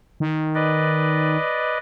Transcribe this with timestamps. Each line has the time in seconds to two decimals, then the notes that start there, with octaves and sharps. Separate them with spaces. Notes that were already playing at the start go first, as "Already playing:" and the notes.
0.20 D#3
0.55 B4 D5 D#5